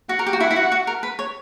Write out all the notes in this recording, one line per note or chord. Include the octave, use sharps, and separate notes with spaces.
F#4 F#5
A#4
G4
F#4
E4 F#5
E4
F#4
F#4
A#4
B4
C#5